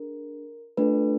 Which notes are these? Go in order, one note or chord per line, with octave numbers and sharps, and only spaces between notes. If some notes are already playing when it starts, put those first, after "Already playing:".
Already playing: D4 G#4 A#4
A3 D4 F4 A4 B4